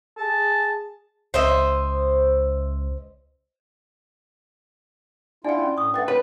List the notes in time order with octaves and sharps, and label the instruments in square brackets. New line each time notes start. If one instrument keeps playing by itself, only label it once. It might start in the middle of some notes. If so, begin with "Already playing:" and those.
[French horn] G#4 [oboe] A5
[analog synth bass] C#2 [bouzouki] C5 D#5 E5
[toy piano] D4 G#5 [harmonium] E4 F4 [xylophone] D5 F#5
[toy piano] C#4
[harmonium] A2 [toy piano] C#6 D#6
[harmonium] A3 [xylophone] B4 A6 [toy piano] F#5 G5
[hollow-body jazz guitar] B4 [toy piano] C#5 [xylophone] B5